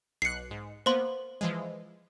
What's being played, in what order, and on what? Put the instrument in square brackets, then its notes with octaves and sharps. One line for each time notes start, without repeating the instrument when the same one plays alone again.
[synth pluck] B1 F#6 [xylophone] C7 C#7
[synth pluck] G#2
[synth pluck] A#3 B3 [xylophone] C5 C6
[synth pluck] E3 F3 G#3